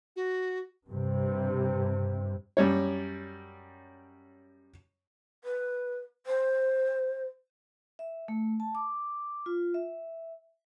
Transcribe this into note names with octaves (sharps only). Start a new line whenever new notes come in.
F#4
G2 C3
F#2 G3 C#5
B4
C5
E5
A3
A5
D6
F4
E5